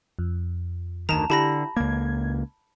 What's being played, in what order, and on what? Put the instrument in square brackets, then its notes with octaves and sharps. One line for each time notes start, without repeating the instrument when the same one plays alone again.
[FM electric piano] F2
[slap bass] D2 D#3 [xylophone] A5 A#5
[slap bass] D3 [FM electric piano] E4 G4 [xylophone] A5 B5 A#6
[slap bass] C#2 A#3 [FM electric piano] G#6